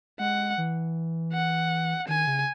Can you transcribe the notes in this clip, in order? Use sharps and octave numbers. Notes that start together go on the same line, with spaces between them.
G#3 F#5
E3
F#5
D#3 G#5
C#3